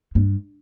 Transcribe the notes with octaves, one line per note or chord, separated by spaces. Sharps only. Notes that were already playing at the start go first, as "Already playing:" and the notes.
G2